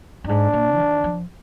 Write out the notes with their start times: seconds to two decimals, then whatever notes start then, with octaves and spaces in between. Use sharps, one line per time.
0.24 G2
0.29 G#2 D4
0.53 A#2
0.74 F3
0.79 D#3
1.04 F3